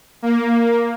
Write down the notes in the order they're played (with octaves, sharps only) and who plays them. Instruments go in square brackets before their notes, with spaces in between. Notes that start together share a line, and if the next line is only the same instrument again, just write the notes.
[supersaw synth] A#3